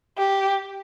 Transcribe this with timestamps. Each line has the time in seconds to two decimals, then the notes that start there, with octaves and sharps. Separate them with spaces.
0.18 G4